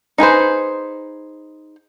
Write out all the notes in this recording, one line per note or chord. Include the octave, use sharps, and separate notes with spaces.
D#4 G#4 B4 C5